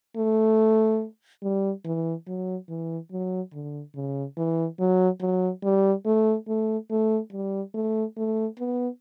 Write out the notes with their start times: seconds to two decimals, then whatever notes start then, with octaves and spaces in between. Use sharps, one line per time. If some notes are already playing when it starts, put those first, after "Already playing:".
0.17 A3
1.42 G3
1.84 E3
2.27 F#3
2.69 E3
3.12 F#3
3.53 D3
3.95 C#3
4.37 E3
4.79 F#3
5.21 F#3
5.63 G3
6.05 A3
6.48 A3
6.90 A3
7.32 G3
7.74 A3
8.17 A3
8.59 B3